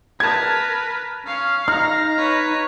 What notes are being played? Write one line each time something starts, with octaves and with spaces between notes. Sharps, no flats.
A#4 B4 A5 G#6
C#4 F5
D#4 A#5 F6
B4 C#5